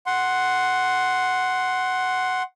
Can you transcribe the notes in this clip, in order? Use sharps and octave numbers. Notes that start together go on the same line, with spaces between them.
F#5 C6